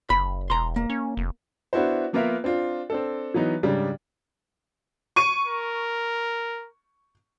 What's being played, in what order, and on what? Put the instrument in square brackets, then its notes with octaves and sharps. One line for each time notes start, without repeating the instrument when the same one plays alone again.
[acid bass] F#1 [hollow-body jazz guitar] B5
[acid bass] E1 [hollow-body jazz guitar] A#5 C6
[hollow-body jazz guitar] A#3
[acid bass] C#4
F1
[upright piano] B3 D4 E4 F#4 C5
F3 A#3 B3 F4 A#4 E5
C4 D4 F4
C4 D4 A4
E3 F#3 B3 D#4
G#2 C#3 G3 D4
[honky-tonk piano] C#6 D#7
[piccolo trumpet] A#4